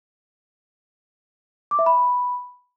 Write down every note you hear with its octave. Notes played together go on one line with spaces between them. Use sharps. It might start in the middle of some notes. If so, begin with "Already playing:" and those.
D6
E5
B5